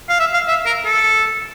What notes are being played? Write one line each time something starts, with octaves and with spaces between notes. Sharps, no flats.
F5
E5
F5
E5
A#4
A4